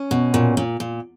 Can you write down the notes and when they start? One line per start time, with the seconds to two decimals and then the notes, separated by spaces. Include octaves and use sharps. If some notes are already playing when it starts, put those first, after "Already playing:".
Already playing: C#4
0.11 B2
0.34 A#2
0.57 A#2
0.80 A#2